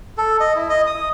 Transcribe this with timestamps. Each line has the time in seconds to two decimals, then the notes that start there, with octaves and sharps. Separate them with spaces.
0.18 A4
0.40 D#5
0.56 E4
0.69 D#5
0.87 D#6